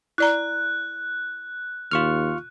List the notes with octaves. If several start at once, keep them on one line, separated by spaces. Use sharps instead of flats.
E4 D5 A#5 F#6
D#2 F4 C#6 F6